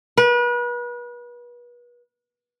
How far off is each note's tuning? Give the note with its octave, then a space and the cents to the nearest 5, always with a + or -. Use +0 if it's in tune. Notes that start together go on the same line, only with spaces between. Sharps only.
B4 -35